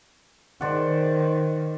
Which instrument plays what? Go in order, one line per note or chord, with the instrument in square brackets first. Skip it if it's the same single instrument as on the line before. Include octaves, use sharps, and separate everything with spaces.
[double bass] D#3 [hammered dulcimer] C5 D5 F#5